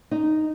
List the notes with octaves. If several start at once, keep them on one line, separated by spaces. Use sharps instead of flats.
D#4